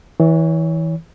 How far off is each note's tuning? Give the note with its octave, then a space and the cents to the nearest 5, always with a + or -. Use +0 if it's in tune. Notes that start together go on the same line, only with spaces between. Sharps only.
E3 -20 C#5 +20